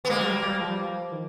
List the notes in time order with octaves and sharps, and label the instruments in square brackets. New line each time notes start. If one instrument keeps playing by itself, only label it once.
[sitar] B3
[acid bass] G#3 [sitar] A#3
[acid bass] F#3
G3
G3
F3
D#3